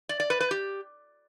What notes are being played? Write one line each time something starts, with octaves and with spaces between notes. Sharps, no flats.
D5
D5
B4
B4
G4